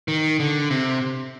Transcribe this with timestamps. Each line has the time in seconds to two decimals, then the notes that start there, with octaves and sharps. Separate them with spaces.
0.08 D#3
0.40 D3
0.70 C3